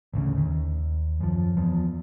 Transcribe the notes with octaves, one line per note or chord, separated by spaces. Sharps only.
A1 D2 C#3
D#2
F#2 F3
E2 F3